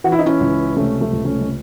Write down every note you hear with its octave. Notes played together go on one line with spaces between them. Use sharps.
E3 F#4
E4
D#4
C#4 E4
C#2
C3 A3 C#4
A3
C#2
A3 C#4
G#3